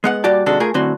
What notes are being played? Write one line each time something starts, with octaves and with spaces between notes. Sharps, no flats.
G#3 B3 F#5
A#2 G3 F#4 G4 D5 A5
C3 D#3 G#3 D4 F#4 A4
A3 F4 G#4 A#4 G#5
F#2 A2 D3 C4 F#4 C6